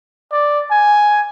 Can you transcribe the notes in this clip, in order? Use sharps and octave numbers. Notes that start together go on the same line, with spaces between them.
D5
G#5